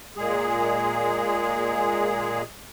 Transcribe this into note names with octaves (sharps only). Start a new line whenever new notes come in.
A#2 G#3 G#4